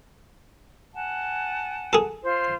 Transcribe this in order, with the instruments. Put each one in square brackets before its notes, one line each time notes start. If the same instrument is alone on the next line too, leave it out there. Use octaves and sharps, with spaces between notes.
[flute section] F#5 G#5 A5
[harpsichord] G#4 A4
[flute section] F4 C5